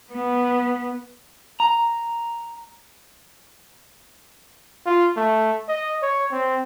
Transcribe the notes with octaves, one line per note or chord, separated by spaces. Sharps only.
B3
A#5
F4
A3
D#5
C#5
C4